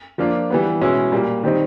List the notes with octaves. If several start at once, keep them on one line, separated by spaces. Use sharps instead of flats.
F3 A#3 D4 F4
E3 G3 B3
B2 G#3 C#4 E4
A#2 G3 A#3
D#3 G3 C4 D#4